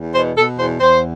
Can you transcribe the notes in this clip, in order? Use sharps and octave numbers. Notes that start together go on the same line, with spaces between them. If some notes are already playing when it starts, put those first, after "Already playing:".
Already playing: E2
B2 C5
B2 A4
E2 C5
E2 C5